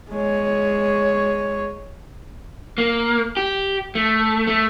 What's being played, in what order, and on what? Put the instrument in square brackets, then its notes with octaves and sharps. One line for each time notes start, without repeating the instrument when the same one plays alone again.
[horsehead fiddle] G#3 C#5
[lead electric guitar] A#3
G4
A3
A3